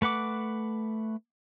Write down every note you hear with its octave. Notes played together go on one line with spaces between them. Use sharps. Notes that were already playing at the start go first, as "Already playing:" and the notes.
A3 B4 F#5 D6